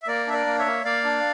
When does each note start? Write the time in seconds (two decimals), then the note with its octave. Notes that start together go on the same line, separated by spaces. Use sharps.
0.03 E5
0.07 A#3 A#4 D5
0.27 D4 E5
0.33 A#4 D5
0.46 A#3
0.59 C#5 E5
0.66 A#3
0.85 A#3 D5 F5
1.04 D4